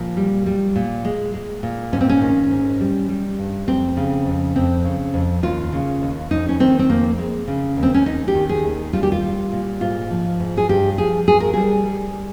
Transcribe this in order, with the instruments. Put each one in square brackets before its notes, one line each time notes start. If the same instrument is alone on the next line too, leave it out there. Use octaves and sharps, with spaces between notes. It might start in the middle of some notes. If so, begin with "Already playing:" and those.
Already playing: [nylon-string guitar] A#2 F3
G3
G3
A#2
G#3
G#3
A#2
G#2 C#4
C4
C#4
D#3
G#2
G3
G3
G2
F2 C4
C#3
F2
F2 C4
C#3
F2
D#2 F4
C#3
D#2
F2 D#4
C#4
D#3 C4
C4
F2 A#3
G#3
C#3
D#2
C4
C#4
D#2 D#4
G4
D#3
G#4
D#2
G3 F4
G4
F4
G3
A#2
G#2 F4
F3
G#2
G#4
G2 G4
F3 G#4
G2 G#4
A#4
G3 G#4
G3